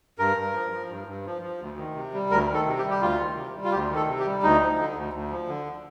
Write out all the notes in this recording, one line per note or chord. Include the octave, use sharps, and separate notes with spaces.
G2 A#4
G2
F3
F3
G2
G2
F3
F3
D2
D#3
C3
G3
D2 A#4
D#3
A4
C3
G4
G3
G4
D2 F4
D#3
C3
G3
F4
D2 G4
D#3
A4
C3
G4
G3
D2 D#4
F3
D3
D2
D2
F3
D3